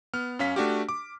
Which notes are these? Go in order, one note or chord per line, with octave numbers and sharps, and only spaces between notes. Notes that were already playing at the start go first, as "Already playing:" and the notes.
B3 F6
F#2 C#4 F5 B6
A3 D4 F#4 G4
D6